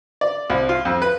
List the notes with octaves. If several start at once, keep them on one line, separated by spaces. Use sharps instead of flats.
D5
C2
F4
F2
B4